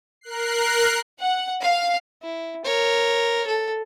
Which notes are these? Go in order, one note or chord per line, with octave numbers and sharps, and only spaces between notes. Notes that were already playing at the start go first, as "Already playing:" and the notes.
A#4 F#6 C7
F#5
F5
E4
A#4 C#5
A4